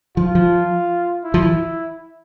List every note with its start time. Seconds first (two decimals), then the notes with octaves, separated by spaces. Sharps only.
0.17 F3 F4
0.35 F3
1.24 E4
1.34 F3
1.43 E3